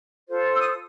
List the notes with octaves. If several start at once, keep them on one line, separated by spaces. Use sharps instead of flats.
F4 A4 C5
E6
D#6